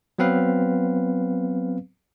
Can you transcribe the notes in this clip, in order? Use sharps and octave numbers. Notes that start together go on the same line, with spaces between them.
F#3 B3 C4 B4 F5